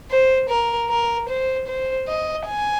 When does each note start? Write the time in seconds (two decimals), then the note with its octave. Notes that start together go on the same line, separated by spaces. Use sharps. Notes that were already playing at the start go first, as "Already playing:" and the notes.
0.10 C5
0.49 A#4
0.89 A#4
1.29 C5
1.67 C5
2.07 D#5
2.46 G#5